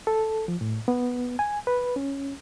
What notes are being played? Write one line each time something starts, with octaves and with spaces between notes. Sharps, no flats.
A4
F3
A2
B3
G#5
B4
C#4